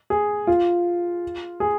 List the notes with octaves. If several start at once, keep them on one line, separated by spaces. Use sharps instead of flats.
G#4
F4
G#4